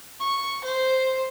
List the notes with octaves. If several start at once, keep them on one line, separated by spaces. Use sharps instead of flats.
C#6
C5